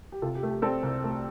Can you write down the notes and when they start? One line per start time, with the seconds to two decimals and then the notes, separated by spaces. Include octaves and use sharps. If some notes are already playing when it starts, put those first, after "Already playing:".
0.12 G4
0.22 C3 F4 A4
0.35 G4
0.43 A3
0.49 G4
0.62 C4 A4 D5
0.83 C2
1.04 A3